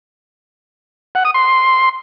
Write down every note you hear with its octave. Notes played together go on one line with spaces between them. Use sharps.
F#5
D#6
C6